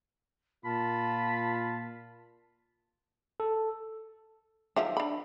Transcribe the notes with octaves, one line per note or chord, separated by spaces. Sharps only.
A#2 F4 A5 B5
A4
D#3 F3 F#3 E5
D4 B5